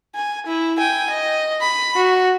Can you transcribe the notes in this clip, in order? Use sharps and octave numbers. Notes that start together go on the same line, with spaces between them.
G#5
E4
G5 G#5
D#5
B5
F#4